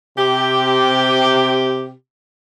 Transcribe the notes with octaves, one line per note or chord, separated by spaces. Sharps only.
C3 G4